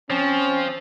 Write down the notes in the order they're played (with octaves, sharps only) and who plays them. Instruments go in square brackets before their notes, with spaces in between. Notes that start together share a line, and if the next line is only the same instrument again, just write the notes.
[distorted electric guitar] F3 [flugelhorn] C4 [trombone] C#4